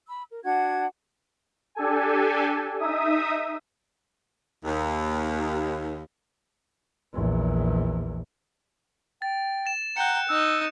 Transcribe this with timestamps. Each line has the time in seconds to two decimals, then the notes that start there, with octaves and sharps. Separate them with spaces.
0.07 B5 E6
0.29 A#4
0.43 D4 F#4 F#5 G#6
1.75 D4 G4 A4 G#5
2.79 D#4 E5 D#6
4.65 D#2
7.14 A#1 E2
9.22 G5 A6
9.66 A6 E7
9.97 F#5 G5 A#5 F#6 C#7
10.28 D#4 E6